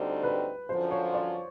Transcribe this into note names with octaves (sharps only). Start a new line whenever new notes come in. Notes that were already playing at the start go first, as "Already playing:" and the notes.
Already playing: D2 D3 G3 C4 D#4
B4
F#2 D3 F3 C5
C#5
D5